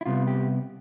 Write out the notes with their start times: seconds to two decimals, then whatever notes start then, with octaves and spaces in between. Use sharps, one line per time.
0.01 E4
0.06 C3 G3 B3 F4
0.27 G4